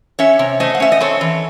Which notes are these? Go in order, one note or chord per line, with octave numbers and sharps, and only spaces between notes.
C#4 C#5 E5
C3
A3 C5 D#5
F#5
C#4 E5
D#5
C4 A4 C#5
E3